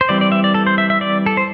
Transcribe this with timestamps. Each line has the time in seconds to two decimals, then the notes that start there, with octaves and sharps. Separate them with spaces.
0.01 C5
0.09 E3 G3 C4 D5
0.21 D5
0.32 E5
0.44 D5
0.54 A4
0.67 C5
0.78 E5
0.90 E5
1.01 D5
1.26 A4
1.37 C5